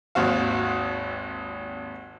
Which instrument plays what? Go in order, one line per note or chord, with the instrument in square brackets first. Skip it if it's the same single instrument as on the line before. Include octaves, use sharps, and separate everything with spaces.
[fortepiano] G#1 D#2 C4 F#4 F5